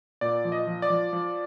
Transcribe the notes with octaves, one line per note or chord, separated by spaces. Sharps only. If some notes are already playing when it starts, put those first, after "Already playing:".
A#2 D5
F3
D#5
F3
D5
F3
F3